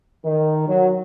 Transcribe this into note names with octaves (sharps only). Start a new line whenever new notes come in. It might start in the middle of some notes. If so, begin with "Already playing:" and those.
D#3
F#3